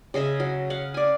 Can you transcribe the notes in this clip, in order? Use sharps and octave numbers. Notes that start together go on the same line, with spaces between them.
C#3 G#4 D#5 E5
F#3
F5 F#5
D5 G#5